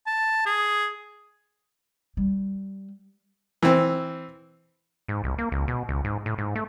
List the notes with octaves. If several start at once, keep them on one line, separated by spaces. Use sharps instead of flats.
A5
G#4
G3
E3 C4
G#2
C2
A#3
C#2
B2
C#2
G#2
A2
G#2
A3